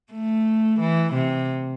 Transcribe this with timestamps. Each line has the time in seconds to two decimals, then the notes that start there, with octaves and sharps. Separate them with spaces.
0.13 A3
0.80 E3
1.14 C3